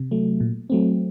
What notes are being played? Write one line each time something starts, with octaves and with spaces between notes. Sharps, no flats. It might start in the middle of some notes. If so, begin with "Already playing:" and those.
Already playing: C3
F#3 A3
A#2
F#3 A3 C4